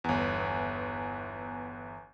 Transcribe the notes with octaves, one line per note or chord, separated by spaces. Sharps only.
G1 E2